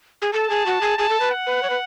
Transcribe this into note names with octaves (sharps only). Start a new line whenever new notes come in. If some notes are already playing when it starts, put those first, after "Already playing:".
G#4
A4 A5
G#4
F#4
G#4
G#4 A5
A4
B4
F#5
B4
C#5
B4